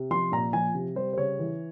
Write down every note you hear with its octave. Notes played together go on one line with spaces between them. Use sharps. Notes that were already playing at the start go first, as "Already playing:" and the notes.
Already playing: C3
F3 C6
A#2 A#5
F3 G#5
C3
G3 C5
C5
C#3 C#5
E3